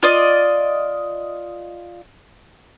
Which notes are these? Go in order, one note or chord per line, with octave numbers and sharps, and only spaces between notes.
F4 D5 D#5